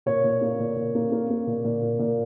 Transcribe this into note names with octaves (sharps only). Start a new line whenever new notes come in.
A#2 C#5
A#2
A#3
A#2
A#2
A#3
A#3
A#3
A#2
A#2
A#2
A#2